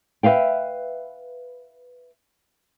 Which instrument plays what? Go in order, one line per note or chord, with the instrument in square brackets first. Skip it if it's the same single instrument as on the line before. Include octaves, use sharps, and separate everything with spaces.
[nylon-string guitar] B4 E5 F5 G5